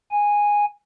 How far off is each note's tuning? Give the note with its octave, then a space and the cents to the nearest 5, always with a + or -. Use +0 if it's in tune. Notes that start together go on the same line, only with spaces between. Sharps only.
G#5 -10